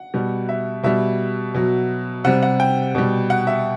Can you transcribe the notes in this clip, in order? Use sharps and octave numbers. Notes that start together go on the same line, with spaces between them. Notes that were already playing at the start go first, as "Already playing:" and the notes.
Already playing: F#5
B2 G3
E5
B2 G3 E5
B2 F#3
C3 G3 F#5
F#5
G5
B2 G3
F#5
E5